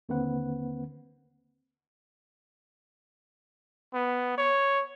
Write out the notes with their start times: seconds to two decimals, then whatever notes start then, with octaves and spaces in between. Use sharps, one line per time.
0.09 D#2 D3 A#3 C4 B4 F#5
3.94 B3
4.38 C#5